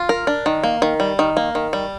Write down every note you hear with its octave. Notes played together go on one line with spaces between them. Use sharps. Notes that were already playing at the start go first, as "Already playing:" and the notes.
Already playing: F4
A#4
D4
D#3
A#3
D#3
G3
D#3
A#3
D#3
G3